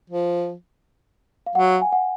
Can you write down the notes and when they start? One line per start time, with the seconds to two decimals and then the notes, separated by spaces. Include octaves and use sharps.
0.10 F3
1.46 F5
1.55 F#3 F#5
1.82 G#5
1.92 F#5